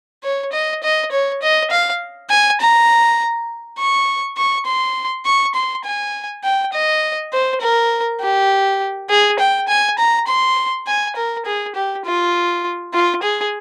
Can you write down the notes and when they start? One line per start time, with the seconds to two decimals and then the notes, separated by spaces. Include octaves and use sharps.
0.23 C#5
0.53 D#5
0.83 D#5
1.12 C#5
1.42 D#5
1.71 F5
2.30 G#5
2.60 A#5
3.78 C#6
4.37 C#6
4.66 C6
5.26 C#6
5.55 C6
5.85 G#5
6.44 G5
6.73 D#5
7.33 C5
7.61 A#4
8.21 G4
9.10 G#4
9.39 G5
9.68 G#5
9.98 A#5
10.27 C6
10.87 G#5
11.16 A#4
11.46 G#4
11.75 G4
12.05 F4
12.94 F4
13.23 G#4